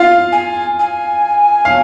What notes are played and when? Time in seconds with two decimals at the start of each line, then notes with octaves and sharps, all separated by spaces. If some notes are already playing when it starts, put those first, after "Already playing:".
Already playing: F4 F5
0.32 G#5
0.79 G#5
1.65 F5